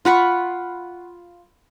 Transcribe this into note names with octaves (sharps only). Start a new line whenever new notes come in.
F4 F#5 B5 C#6